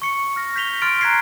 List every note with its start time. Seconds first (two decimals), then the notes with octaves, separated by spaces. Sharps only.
0.02 C#6 C#7
0.36 F6 A#6
0.56 G6 B6 F7 G7
0.82 C6 F6 A6 D7
1.01 A#5 F#6 G#6 B6 C7